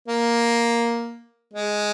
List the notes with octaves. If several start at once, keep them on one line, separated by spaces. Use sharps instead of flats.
A#3
G#3